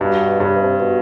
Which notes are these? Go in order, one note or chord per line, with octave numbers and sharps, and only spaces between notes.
G2 B2
G2 C#3
C3
B2
C3
B2